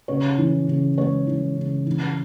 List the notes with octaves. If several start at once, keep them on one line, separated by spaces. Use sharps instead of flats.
C#3 C#5
E3
C#3
G#3 C#5
E3
C#3
E3